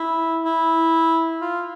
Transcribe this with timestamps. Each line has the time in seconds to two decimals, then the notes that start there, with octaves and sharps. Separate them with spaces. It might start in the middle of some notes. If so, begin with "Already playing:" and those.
Already playing: E4
0.43 E4
1.41 F4